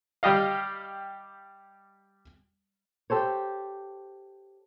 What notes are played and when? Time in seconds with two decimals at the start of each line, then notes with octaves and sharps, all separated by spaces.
0.23 G3 G4 D#5 F5
3.10 G4 A4 C5 C#5